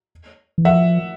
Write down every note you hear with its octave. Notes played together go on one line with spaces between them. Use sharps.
E3
F3 E5 F#5